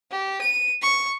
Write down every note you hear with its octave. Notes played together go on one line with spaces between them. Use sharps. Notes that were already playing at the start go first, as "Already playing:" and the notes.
G4
D#7
C#6